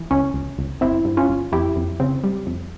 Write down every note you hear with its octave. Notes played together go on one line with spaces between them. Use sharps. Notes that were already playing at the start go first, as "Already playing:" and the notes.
Already playing: E3
C#2 C#4
C#2
C#2
G1 C4 E4
G2
C#4 F4
G1
F2 E4 G4
F2
C#3 C4
G3
F2